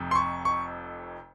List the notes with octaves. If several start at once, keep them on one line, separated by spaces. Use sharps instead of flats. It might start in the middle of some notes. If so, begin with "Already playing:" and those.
Already playing: F1 F2 C3
C6
C#6
C#6